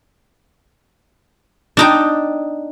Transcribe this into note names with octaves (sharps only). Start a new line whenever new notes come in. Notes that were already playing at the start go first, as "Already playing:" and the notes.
D4 D#4 G5